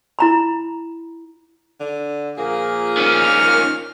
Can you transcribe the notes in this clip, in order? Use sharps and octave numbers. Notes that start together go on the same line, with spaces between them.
E4 A#5 B5
D3
A#2 F3 A#3 G#4
D#3 C#4 F6